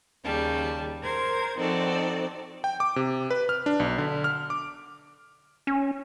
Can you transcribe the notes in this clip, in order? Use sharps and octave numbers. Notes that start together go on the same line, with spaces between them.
D#2 C#3 G3 A5
A#4 C5 G#6
F3 C4 D#4 F#4 A4 D5
G5
D6
C3
B4
F6
D4
B1
D3
F6
D6
C#4